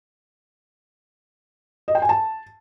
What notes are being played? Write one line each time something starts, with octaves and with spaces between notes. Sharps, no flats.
D#5
G5
G#5
A5